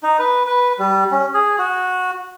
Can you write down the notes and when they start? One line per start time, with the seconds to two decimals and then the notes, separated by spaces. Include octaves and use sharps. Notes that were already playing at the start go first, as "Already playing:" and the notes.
0.03 D#4
0.19 B4
0.47 B4
0.79 G3
1.11 C#4
1.34 G#4
1.58 F#4